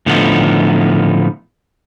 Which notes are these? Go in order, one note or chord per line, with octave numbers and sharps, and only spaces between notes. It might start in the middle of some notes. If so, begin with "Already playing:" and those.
A2 D3 F3 G#3 B3 D#4